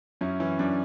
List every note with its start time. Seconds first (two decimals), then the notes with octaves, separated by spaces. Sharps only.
0.21 F#2 C#4 E4
0.40 E3 C#4
0.59 F#2 D4